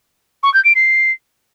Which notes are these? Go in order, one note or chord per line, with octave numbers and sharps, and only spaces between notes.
C#6
G6
D7
C7